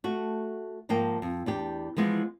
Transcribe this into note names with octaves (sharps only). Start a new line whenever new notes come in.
A3 F#4
G#2 F3 A#3 G5 A5
F2
E2 D4 G4
E3 F3 G#3 B3